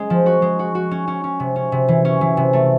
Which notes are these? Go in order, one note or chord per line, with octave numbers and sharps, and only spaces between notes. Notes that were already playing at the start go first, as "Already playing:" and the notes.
Already playing: G#3 C#4
F3
F#4
G#3
F#4
F#4
C#4
C#4
C#4
C3
C#4
C3
E3
C#4
E3
C3
A3